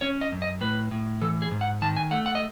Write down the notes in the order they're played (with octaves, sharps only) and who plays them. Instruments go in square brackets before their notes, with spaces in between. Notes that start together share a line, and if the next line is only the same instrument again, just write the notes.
[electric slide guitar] C#4 C#5
D#5
F#2
D#5
A2 B4
A2
E3 A4
G#4
G#2
F#5
D#3 A5
G#5
A3 F#5
F#5
D#5